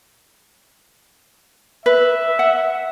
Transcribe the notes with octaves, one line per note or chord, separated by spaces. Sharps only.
B4 E5
F#5